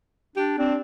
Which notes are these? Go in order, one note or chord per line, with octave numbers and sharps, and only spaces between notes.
D4 G4
C4 D4